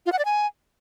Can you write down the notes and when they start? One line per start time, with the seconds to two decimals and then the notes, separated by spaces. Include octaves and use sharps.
0.06 F4
0.12 F#5
0.19 D5
0.25 G#5